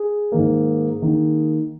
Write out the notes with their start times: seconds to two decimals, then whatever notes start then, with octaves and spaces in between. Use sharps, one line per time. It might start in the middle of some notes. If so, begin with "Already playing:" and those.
Already playing: G#4
0.32 G#2 D#3 A#3
1.02 D#3 A#3